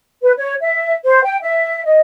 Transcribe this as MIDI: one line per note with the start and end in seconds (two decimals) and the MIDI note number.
0.22 0.31 71
0.37 0.53 73
0.60 0.93 76
1.04 1.22 72
1.23 1.36 79
1.42 1.84 76
1.85 2.00 75